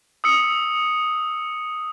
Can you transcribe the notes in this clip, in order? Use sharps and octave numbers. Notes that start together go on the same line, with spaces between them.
D#6 E6 C#7